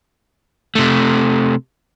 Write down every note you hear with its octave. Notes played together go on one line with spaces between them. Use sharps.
C3 A3